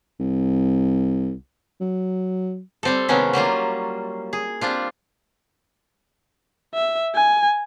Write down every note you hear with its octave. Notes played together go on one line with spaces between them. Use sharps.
C2
F#3
G3 C4 A4
C3 D#3 F3 G#3 B3 C#4
F#3 G3 A#3 F4
G#4
G3 C4 D4 F4
E5
G#5